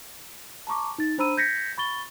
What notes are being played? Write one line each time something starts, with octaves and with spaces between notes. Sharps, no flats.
A5 A#5 C#6 D6
D#4 A6
D4 C5 A#5 B5 E6 D#7
G6 G#6 A#6 B6 C#7
B5 C#6 A6 G7